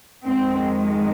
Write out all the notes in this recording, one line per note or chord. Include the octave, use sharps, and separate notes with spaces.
F2 D#3 G#3 C4